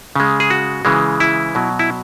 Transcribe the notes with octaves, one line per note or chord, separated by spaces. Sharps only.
C#3 G#3
G#4
F#4
C#3 E3 G#3
E4
B2 F#3
E4